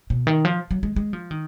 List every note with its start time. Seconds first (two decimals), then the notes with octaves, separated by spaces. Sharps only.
0.10 B2
0.27 D#3
0.45 F3
0.71 F#3
0.83 G#3
0.96 G#3
1.13 F3
1.31 D#3